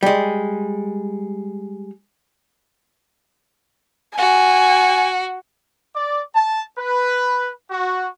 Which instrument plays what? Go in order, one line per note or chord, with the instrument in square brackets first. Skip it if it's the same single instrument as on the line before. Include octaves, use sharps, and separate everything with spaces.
[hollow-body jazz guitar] G3 G#3
[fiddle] F#4 [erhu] G#5
[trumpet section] D5
A5
B4
F#4